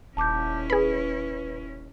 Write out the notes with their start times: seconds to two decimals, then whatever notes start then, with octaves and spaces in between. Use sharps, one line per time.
0.17 D#1 C#4 E4 A5 D6 G6
0.70 G#4 B4 B5